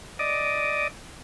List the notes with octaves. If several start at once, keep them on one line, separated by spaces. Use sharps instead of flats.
D5 D#5